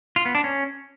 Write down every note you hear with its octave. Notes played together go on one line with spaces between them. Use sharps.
F4
B3
D4
C#4